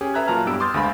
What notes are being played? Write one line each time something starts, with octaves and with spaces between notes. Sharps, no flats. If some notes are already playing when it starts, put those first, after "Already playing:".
C#4 G4 G#4
A4 B4 E5 A#5 F#6 G#6
A#2 F#3 F4 A5 A#5 F6
G2 B3 E4 G4 E6 D7
C6 D6 D#6 F6 G6 A6
D2 G#3 F5 B5